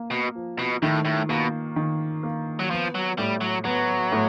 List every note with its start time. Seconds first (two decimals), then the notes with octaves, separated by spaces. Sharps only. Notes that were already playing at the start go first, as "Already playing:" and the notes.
Already playing: A#3
0.11 B2
0.35 F3
0.59 B2
0.82 A2 D#3
1.05 A2
1.29 B2 A#3
1.76 D#3
2.23 A#3
2.59 F#3
2.70 F3 B3
2.95 F#3
3.18 A2 G3
3.41 F#3
3.65 F#3 B3
4.12 A2